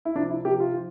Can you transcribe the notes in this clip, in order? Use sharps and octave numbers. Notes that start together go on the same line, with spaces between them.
E4
C3 F3 D4
E4
C3 F3 G4
F4
F3